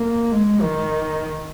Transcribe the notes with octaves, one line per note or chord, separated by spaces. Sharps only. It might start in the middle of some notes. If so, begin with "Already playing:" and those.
Already playing: A#3
G#3
D#3